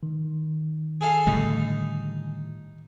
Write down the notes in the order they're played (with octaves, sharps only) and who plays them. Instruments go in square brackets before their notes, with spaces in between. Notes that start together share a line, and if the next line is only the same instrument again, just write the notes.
[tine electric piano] D#3
[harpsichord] G#4 A4 F5
[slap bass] A2 D3 G3 [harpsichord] D#4